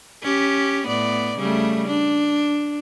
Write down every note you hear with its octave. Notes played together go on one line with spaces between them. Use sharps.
C#4 G4
A2 B3 D5
C#3 G3 A3
D4